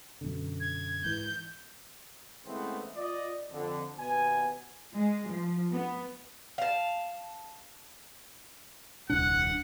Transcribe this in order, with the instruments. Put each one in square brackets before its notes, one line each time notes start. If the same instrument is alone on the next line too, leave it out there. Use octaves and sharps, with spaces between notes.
[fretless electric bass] F#2 B2 D3
[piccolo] G#6
[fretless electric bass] G#2 E3 [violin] G6
[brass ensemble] C#3 E3 G#3 A3 B3 C4
F4 D5 D#5
F2 D3
D#2 B2 B3 G#5
[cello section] G#3
F3
B3
[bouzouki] F5 A5
[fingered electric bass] D#1 C2 D4 [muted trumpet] F#5